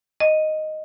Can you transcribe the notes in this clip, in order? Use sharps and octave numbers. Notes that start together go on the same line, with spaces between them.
D#5